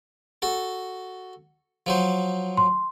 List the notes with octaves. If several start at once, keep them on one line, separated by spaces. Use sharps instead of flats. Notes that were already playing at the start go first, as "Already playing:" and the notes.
F#4 A4
F3 F#3 C5
C6